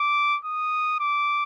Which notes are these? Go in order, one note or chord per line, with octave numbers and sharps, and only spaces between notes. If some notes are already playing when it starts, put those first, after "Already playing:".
Already playing: D6
D#6
D6